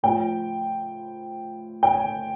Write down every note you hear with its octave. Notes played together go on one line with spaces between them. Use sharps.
A2 F3 G5
G5
G#5